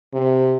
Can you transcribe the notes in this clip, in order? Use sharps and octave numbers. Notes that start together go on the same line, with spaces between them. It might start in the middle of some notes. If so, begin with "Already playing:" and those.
C3